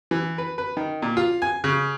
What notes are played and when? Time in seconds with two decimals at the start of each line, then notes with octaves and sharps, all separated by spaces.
0.11 E3
0.38 B4
0.58 B4
0.77 D#3
1.02 A#2
1.17 F4
1.42 G#5
1.64 C#3